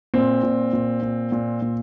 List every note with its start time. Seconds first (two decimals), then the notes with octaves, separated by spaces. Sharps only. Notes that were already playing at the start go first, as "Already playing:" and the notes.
0.14 A#2 C4
0.43 A#2
0.73 A#2
1.02 A#2
1.32 A#2
1.62 A#2